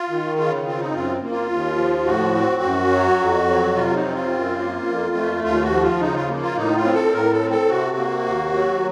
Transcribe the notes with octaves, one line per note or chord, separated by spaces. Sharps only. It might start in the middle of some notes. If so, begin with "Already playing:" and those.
Already playing: F4
D#3
C#3 F4
C4 F4
D#4
F#2 F4
A#3
F4
D#2
F3
A2 F#4
C4
F#2
F#3
F2
F#3
C3 F4
D#4
C4
F4
F#2
A#3
F2
A3
D#2 F4
F#4
F3
F4
C#3 D#4
F4
A#3
F4
A2 D#4
F4
C4
A4
A2 A#4
A4
C4
A4
C3 F#4
A#3
D#2
F#3